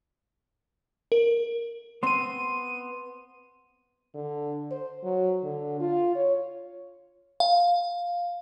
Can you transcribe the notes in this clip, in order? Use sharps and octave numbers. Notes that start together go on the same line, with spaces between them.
A#4
B3 C4 C6 D#7
D3
C5
F#3
D3
F4
C#5
F5